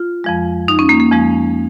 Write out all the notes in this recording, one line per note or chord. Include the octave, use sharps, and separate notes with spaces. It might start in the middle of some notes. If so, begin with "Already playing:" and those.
Already playing: F4
F2 F3 G#3
D#4
C#4
A#3
A#3
F2 F3 G#3